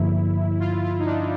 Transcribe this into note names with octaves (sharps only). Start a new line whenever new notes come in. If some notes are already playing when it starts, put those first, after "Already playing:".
Already playing: G2 D3 F3 A#3 E4
F4
F4
D#4
D4